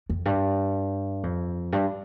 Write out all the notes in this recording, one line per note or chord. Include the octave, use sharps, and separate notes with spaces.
F2
G2
F2
G2